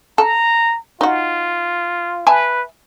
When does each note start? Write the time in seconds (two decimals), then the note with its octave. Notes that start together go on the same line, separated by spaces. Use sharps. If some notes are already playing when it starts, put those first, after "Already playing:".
0.18 A4 A#5
1.01 D#4 F4 F#4
2.27 B4 E5 G#5 A5